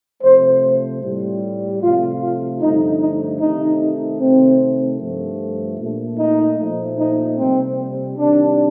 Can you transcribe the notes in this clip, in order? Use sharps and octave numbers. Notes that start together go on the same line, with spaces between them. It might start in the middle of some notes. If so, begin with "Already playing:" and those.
C3 F3 A3 C5
A2 G3
C3 F3 A3 F4
F4
G2 D3 F3 A3 D#4
D#4
C3 D#3 A3 D#4
C3 D#3 A3 C4
G2 F3 A3
A#2 A3
D#4
A#2 F3 A3
D#4
C3 G3 C4
C3 D#3 G3 D4